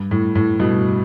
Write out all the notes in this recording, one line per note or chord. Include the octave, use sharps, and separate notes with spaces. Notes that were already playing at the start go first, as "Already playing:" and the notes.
Already playing: G2
A2
A2
G2 B2